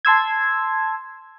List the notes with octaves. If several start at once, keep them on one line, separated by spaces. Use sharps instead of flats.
A5 C6 E6 G#6